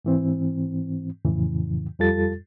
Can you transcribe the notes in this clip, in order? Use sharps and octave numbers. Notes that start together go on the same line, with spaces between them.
G#2 E3 C4
F2 A2 C#3 E3
F2 G3 F4 A4 A6